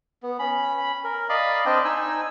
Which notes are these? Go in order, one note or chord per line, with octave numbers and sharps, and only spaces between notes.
B3
C#4 B5
A#4
D5 D#5 F5 B5
C4 D4 D#5 G5
D#4 G#5 E6